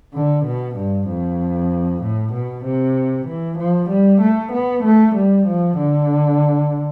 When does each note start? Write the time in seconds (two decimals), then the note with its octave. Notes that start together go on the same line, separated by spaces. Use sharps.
0.14 D3
0.45 B2
0.76 G2
1.08 F2
2.02 A2
2.33 B2
2.65 C3
3.27 E3
3.58 F3
3.90 G3
4.21 A3
4.53 B3
4.84 A3
5.15 G3
5.47 F3
5.78 D3